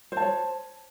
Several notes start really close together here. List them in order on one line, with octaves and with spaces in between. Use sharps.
C5 A5 C#5